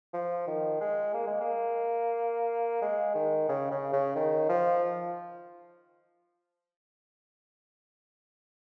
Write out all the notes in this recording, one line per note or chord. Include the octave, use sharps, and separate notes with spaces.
F3
D#3
G#3
A#3
G#3
A#3
G#3
D#3
C#3
C#3
C#3
D#3
F3